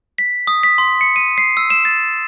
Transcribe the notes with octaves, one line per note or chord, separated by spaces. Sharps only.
B6
D#6
B6
C6
C#7
D#7
C7
E6
E7
A6